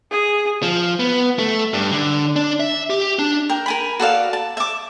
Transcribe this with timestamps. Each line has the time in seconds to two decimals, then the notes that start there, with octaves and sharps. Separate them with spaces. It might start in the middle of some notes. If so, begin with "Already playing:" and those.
0.11 G#4
0.63 F3
1.00 B3
1.39 A3
1.74 G2
1.92 D3
2.36 D4
2.60 E5
2.90 G4
3.19 D4
3.49 A#4 G5
3.66 A#4 G#5 B5
4.00 F#4 A4 D5 F5
4.33 A5
4.57 E5 D6